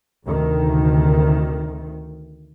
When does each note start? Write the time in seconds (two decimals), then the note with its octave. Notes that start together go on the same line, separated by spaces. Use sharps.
0.25 D2 C3 D#3